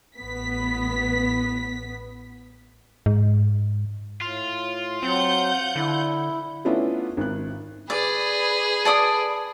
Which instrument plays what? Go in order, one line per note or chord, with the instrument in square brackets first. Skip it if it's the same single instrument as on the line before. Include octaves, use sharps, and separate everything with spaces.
[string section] A1 B3 B6
[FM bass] G#2
[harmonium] A2 [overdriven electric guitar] F4
[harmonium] F#3 [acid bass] C4 [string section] F#5 G6
[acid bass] D3 [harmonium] E4
[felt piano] A3 B3 C#4 D4 E4 F4
G#1 F#6
[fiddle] G#4 B4 [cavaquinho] D5
[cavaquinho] A4 D5 D#6